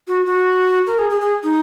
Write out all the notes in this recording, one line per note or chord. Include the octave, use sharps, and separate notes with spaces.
F#4
F#4
A#4
G#4
G#4
G#4
D#4